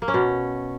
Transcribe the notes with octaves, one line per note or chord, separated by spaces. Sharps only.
A#3
C#4
B2